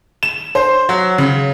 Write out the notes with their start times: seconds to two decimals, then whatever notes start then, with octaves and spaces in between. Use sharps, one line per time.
0.23 E7
0.55 C5
0.89 F#3
1.18 C#3